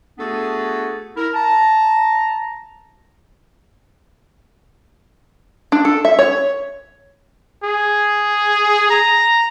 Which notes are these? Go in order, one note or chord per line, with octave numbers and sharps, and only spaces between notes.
A3 B3 D4 F#4 G#4 A4
E4 A#4
A5 A#5
D4
A4
E5
C#5
G#4
A#5